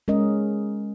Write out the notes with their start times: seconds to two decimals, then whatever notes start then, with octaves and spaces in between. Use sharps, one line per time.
0.08 G#3 C#4 A#4 D#5